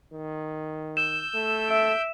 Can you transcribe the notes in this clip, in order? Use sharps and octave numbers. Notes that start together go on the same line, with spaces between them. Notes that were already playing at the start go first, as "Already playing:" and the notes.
D#3
E6 G6 E7
A3
E5 D7